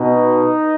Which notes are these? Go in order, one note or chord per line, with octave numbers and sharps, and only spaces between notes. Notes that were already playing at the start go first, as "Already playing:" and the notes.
Already playing: B2 D#4